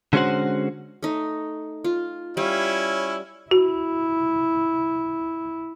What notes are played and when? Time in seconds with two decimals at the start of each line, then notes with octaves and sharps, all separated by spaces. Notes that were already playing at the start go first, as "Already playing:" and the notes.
0.13 D3 G#3 C#4 F#4 C5 F#5
1.03 A3 D#4
1.84 F4
2.37 G3 C#4 E4 F5
3.51 E4 F#4